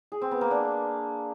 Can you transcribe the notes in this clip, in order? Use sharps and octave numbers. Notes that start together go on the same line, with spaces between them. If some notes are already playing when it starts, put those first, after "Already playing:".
G#4
C4
B3
A#3
D4